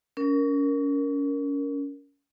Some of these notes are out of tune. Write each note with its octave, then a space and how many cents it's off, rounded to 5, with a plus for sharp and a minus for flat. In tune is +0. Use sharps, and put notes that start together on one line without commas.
C#4 +30 A#4 +0